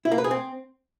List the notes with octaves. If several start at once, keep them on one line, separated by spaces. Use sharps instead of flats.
E4
A#3
B4
G#4
C4